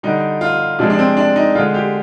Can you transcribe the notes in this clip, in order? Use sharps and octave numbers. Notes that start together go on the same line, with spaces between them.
D3 G3 D#4
F4
C3 F3 G#3 D4
D4
C4
D4
D#4
D3 G#3 F4
G4